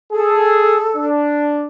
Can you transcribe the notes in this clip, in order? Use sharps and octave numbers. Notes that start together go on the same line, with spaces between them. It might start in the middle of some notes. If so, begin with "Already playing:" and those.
G#4 A4
D4